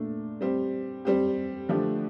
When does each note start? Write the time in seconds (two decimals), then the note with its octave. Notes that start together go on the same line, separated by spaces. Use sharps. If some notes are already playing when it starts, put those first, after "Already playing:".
Already playing: A#2 A3 D4
0.41 G3 C4 G4
1.05 G3 C4 G4
1.69 D3 F3 A3 D4 G4